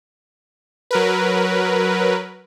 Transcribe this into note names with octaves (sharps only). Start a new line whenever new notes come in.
F#3 A#4 B4